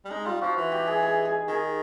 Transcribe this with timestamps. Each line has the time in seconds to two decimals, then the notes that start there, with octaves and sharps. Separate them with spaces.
0.05 G3
0.10 G#3 D#4
0.26 G3 F4
0.41 F3 F#4
0.57 E3
0.72 G4
0.87 G#4
1.03 G#4
1.25 G#4
1.48 D#3 G#4